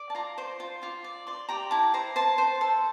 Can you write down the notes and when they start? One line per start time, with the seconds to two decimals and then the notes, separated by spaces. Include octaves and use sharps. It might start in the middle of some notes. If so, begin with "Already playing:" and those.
Already playing: D5
0.10 A5
0.15 F4 A#5
0.38 C5 C6
0.60 F4
0.82 F4 D6
1.04 D5
1.27 D5 C6
1.49 G4 A#5
1.71 E4 A5
1.94 C5 A#5
2.16 C5 A5
2.38 C5
2.61 A4